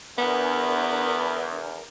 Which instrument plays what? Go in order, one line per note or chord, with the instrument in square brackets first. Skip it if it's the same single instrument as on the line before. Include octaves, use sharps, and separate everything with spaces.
[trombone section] E2 [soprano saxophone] B3 [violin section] D4 A#4